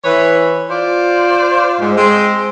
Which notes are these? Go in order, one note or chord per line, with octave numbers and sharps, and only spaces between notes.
E3 B4 C#5
F4 C5 D5
G#2
G#3 C4 C5